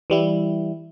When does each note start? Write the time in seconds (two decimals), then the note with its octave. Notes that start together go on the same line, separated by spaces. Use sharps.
0.10 E3 G3 E4